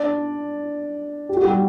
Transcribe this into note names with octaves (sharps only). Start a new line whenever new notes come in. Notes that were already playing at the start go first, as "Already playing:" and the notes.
Already playing: D4 D5
G4
F#4
G3 G4